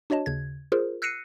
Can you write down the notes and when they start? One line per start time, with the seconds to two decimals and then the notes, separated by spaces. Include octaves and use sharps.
0.10 D4 F#4 C#5 D#5 A5
0.26 D#2 C#3 G#6
0.72 F4 G#4 A#4 C5
1.02 E6 F#6 A#6 C7 C#7 D#7